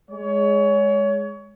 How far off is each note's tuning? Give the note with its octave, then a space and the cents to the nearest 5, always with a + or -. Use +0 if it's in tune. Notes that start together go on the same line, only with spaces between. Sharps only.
G#3 +0 C#5 +25